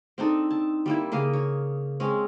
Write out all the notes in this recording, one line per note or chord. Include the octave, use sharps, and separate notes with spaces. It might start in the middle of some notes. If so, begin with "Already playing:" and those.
C4 D4 D#4 A4
A5
G3 A#3 E4
C#3 A#3 D#5 F5
C#5
G#3 C4 C#4